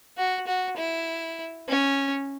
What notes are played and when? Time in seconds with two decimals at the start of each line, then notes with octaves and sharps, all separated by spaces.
0.17 F#4
0.47 F#4
0.77 E4
1.68 C#4